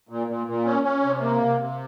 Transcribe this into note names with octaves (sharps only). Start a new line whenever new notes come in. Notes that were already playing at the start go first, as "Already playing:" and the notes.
A#2
A#2
A#2
C#4
C#4
C3
A#3
C3
C3